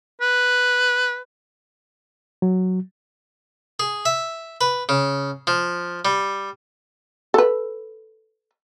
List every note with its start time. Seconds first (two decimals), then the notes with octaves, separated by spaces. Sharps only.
0.21 B4
2.42 F#3
3.80 G#4
4.06 E5
4.61 B4
4.89 C#3
5.47 F3
6.05 G3
7.34 A4 B4